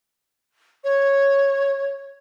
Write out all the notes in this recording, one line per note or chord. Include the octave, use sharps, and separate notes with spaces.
C#5